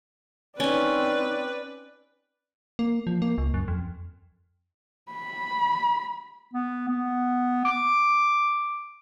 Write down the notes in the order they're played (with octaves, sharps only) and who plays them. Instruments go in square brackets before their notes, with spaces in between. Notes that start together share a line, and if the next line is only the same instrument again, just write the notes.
[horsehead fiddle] C4 D#4 [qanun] C#4 G#5 [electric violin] B4 [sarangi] D5
[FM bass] A#3
F3
A#3
C#2
F#2
F2
[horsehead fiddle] B5
[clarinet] B3
B3
D6